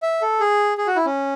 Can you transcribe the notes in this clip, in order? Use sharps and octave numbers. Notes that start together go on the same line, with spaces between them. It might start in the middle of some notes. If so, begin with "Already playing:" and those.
E5
A4
G#4
G#4
F#4
E4
C#4